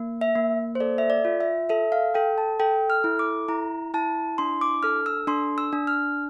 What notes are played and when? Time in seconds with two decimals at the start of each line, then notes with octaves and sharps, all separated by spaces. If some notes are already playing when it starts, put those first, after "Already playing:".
Already playing: A#3
0.21 E5
0.35 A#3
0.75 C5
0.80 A4 D5
0.98 E5
1.10 D5
1.25 F4
1.41 E5
1.69 A4 E5
1.92 F5
2.14 A4 G5
2.38 A5
2.60 A4 G5
2.90 F6
3.04 E4
3.19 D6
3.48 E4 A#5
3.94 E4 A5
4.38 D4 C6
4.61 D6
4.83 A4 F6
5.06 E6
5.27 D4 C6
5.58 E6
5.73 D4
5.87 F6